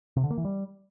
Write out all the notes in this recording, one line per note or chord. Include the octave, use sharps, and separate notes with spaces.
C3
D3
A#3
E3
G3